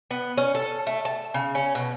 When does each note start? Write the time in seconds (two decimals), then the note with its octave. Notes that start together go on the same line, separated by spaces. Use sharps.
0.11 B3
0.37 C#4
0.55 A4
0.87 A3
1.05 A5
1.34 C#3
1.55 C#4
1.75 B2